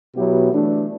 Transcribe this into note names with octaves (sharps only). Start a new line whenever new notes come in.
B2 F#3 B3 E4 G4
E3 A3 D4